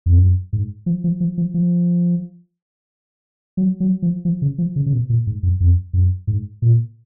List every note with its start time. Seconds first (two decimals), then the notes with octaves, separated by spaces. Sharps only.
0.06 F2
0.18 F#2
0.53 G#2
0.86 F3
1.04 F3
1.20 F3
1.38 F3
1.54 F3
3.57 F#3
3.80 F#3
4.02 F3
4.25 F3
4.42 C#3
4.58 F3
4.76 C#3
4.86 C#3
4.93 B2
5.10 A#2
5.27 G#2
5.43 F#2
5.60 F2
5.93 F#2
6.27 G#2
6.62 A#2